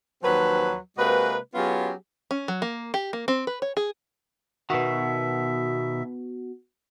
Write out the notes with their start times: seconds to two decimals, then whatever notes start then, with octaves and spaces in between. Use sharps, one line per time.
0.23 D#2 F3 F#3 C4 B4
0.98 C3 G#3 A#3 F#4 B4
1.55 F#3 B3 C#4 F4 G4 G#4
2.31 C#4
2.48 F#3
2.62 A#3
2.94 G4
3.13 A#3
3.28 C4
3.47 B4
3.62 C#5
3.77 G#4
4.70 B2 D#3 B3 F#4 E5